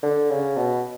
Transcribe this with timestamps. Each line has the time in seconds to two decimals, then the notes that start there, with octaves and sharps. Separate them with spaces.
0.03 D3
0.30 C#3
0.56 B2